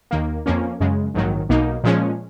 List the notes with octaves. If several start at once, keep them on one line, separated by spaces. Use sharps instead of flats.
D#2 D#3 A#3
F2 F3 A#3 C#4
F#2 C#3 G#3
A#1 G#2 D#3 F#3
B1 B2 A#3 D#4
A#2 F3 G#3 C#4